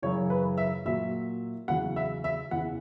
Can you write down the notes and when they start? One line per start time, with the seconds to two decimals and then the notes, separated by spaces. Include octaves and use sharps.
0.02 F#2 C#3 E3 C#5
0.30 B4
0.58 E5
0.85 A#2 F#3 E5
1.68 E2 C#3 F#3 F#5
1.96 E5
2.24 E5
2.51 E2 C#3 E3 F#5